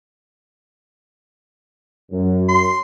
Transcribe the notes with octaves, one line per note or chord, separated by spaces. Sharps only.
F#2
C6